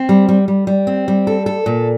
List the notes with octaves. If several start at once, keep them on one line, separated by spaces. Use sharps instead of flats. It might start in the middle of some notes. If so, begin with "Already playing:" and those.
Already playing: C4
G3
G3
G3
G3
C4
G3
A4
A4
A#2